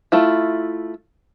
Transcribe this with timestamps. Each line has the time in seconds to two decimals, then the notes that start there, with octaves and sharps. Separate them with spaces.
0.12 A3 E4 F4